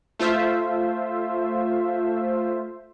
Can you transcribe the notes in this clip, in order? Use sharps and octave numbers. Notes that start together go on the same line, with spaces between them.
A3 F4 C5 E5